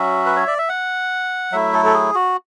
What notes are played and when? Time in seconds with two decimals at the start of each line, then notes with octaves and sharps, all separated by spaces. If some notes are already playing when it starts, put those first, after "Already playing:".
Already playing: F#3 C#4 F#4 E5
0.26 B4
0.36 C#5
0.47 D5
0.58 E5
0.69 F#5
1.52 F#3 A3 E4 E5
1.74 A4
1.86 A4
1.94 G#4
2.15 F#4